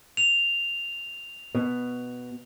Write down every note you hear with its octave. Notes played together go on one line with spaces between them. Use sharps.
F7
B2